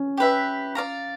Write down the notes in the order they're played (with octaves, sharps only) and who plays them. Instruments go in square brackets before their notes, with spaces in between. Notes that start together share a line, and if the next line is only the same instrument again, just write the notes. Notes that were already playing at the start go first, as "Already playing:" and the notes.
Already playing: [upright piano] C#4
[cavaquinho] G4 B4 E5
D5 F5 A#5